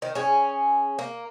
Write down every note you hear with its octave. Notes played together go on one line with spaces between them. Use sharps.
D#3
C#4 G#4
A#3